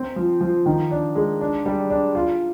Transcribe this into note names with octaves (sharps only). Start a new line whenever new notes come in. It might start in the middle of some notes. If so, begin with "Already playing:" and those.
Already playing: C4
F3
F3
D#3
D4
G#3
D4
G3
D4
F4